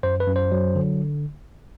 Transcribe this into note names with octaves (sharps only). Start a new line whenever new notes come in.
F#2 C5
B4
F#2
C5
F#3
D3